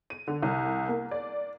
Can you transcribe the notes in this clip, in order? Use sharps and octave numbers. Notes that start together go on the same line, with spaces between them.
D#7
D3
C2
A#3
D5